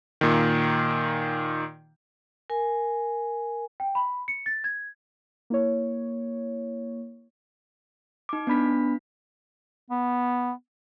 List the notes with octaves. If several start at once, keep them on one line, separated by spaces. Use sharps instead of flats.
A#2 D#3
A#4 G#5
G5
B5
C#7
A6
G#6
A#3 E4 C#5
D#4 D6
B3 D4 B5 B6
B3